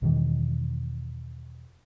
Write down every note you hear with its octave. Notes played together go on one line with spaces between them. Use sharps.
E2 B2 D#3 E3